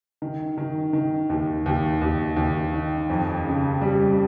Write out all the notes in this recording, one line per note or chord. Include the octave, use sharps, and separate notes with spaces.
D#3
D#3
D#3
D#2
D#2
D#2
D#2
D#3
F2
C#3
G3